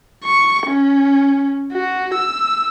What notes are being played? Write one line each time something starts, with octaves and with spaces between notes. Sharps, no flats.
C#6
C#4
F#4
E6